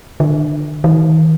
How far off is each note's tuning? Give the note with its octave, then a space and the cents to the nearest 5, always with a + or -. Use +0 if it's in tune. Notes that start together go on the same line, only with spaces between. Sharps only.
D3 +30
D#3 +40